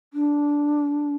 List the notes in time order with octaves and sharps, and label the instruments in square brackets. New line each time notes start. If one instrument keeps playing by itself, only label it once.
[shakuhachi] D4